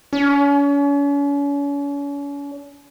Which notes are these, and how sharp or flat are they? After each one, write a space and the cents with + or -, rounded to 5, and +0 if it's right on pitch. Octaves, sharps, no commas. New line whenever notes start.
C#4 +40